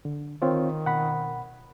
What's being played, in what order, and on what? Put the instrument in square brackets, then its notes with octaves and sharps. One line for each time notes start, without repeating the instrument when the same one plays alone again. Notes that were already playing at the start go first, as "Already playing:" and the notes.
[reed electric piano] D3
[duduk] D#3 [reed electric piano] C4 F4 C#5
[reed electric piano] B2 F#5 B5